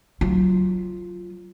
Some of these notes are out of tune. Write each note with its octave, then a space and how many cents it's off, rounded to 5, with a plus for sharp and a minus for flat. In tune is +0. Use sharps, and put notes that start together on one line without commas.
F#3 +0 F4 +0